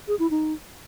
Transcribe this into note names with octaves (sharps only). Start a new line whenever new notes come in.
G#4
E4
D#4